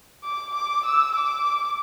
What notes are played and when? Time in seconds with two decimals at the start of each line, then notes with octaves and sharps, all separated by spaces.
0.24 D6
0.54 D6
0.86 E6
1.15 D6